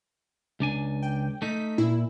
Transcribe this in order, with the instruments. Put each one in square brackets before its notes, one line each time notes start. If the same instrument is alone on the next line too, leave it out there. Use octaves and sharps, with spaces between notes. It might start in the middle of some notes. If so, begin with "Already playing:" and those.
[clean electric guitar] C#2 D4 G#5
[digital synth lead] G5
[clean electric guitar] A3 D#4 [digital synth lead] B6
[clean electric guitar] A#2 [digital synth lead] E4